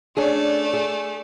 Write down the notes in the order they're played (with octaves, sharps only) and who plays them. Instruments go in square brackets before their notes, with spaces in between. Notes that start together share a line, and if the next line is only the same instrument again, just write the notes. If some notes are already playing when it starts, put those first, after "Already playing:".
[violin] A3 D5 [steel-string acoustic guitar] C#4 D4 G#4
[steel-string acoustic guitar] G#4